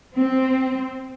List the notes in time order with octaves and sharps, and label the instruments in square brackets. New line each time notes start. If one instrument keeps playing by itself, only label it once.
[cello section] C4